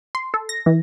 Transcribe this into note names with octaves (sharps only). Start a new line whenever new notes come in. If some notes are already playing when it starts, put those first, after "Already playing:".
C6
A4
A#6
E3